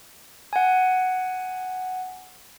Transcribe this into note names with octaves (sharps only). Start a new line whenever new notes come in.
F#5 G#5